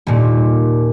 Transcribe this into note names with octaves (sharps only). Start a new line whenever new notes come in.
D#1 A#2